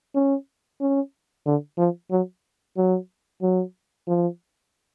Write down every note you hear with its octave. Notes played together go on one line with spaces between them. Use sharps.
C#4
C#4
D3
F3
F#3
F#3
F#3
F3